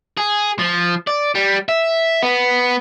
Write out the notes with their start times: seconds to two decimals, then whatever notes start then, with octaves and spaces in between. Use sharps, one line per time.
0.17 G#4
0.59 F3
1.07 D5
1.35 G3
1.69 E5
2.23 B3